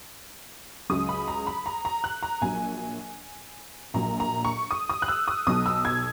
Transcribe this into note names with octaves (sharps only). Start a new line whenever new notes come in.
C#2 C#3 F#3 D#6
B5
A#5
B5
A#5
A#5
F#6
A#5
A#1 A#2 F#3 G#5
A#1 A#2 F#3 A#5
A#5
C#6
D#6
D#6
F#6
E6
D#6
B1 B2 F#3 D#6
E6
G#6